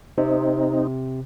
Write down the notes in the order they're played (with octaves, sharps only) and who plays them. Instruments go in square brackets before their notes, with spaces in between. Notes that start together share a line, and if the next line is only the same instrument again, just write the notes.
[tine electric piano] C3 [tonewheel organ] C4 D#4